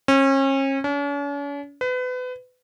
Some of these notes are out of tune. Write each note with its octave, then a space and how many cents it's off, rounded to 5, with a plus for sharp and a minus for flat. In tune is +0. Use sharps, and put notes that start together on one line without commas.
C#4 -35
C#4 +45
B4 +30